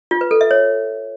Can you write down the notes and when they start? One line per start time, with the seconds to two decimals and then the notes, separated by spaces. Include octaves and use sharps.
0.11 F4
0.21 B4
0.31 A4
0.41 E5
0.51 C#5